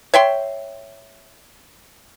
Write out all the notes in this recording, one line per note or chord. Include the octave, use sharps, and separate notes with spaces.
C#5 E5 G5 C6